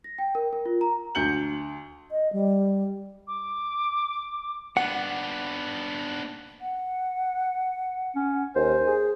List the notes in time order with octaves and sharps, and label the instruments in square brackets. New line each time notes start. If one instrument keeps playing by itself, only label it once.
[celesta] A#6
G5
A#4
A#4
F4
A#5
[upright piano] D2 G6 C#7 F#7
[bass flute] D#5
G3
[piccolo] D6
[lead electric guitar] B3 D4 [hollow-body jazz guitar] F#5
[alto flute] F#5
[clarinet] C#4
[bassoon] D#2 [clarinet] C5 [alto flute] G#5
[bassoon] G#4